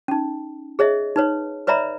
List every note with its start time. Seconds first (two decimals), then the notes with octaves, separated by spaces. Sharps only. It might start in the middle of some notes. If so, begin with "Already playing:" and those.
0.08 C#4 D#4
0.79 G#4 C#5 D#5 E5
1.16 D#4 B4 C#5
1.67 B4 C#5 D5 E5 A#5 B5